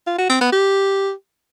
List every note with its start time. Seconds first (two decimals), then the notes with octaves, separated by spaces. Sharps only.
0.07 F4
0.18 F#4
0.30 C4
0.41 B3
0.52 G4